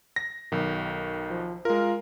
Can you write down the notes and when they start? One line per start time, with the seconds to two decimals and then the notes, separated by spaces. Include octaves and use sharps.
0.16 A#6
0.52 B1 D#3
1.30 F3
1.65 G#3 F4 A#4